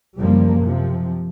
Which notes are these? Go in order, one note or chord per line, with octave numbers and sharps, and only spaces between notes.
F#1 F3 G3 A#3
C3 F3